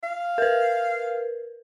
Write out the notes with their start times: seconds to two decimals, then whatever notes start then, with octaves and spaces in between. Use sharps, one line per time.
0.03 F5
0.38 A#4 B4